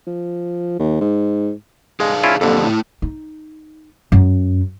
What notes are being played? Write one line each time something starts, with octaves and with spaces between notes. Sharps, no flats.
F3
D#2
G#2
G#3 G#4 D5 F5
C#4 E4 F4
F2 D3 A#3 G4 A4
A3 E4
D#4
F#2